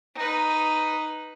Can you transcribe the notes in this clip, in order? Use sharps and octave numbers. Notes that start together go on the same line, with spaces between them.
D#4 B4